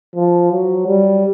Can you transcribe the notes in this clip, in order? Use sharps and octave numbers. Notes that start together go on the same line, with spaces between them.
F3
F#3
G3